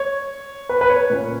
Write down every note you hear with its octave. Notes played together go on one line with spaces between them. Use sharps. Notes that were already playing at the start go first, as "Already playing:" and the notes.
Already playing: C#5
B4
B4
C#5
A#2 A#3 C#4